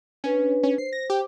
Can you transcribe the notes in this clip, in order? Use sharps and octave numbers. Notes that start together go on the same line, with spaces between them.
C#4 D4 B4
C#4
C5 C7
A#6
G4